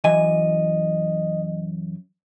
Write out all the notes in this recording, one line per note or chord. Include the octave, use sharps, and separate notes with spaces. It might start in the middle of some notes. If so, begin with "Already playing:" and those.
F#2 E3 D#5 G#5